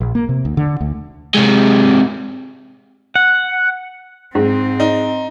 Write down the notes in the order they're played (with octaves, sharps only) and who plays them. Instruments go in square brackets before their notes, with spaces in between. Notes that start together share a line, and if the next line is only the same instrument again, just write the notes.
[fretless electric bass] A#1
A#3
C3
D2
D3
D2
[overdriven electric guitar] C3 G#3
[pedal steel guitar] F#5
[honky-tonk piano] G#2 [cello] C4
[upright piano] D#4